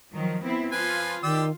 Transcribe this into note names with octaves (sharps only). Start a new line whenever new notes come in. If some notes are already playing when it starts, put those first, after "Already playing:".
D#3 F3 F#3
B3 C4 E4
F3 F4 B4 G#5
D#3 G4 D5 E6